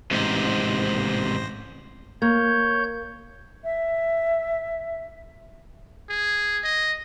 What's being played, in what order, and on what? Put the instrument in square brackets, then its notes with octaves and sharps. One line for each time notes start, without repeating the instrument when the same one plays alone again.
[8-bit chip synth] A1 C5 A#6 [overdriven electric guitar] G#2 C3
[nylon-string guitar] A#3 [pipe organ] C#5 G6
[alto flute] E5
[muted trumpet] G#4
D#5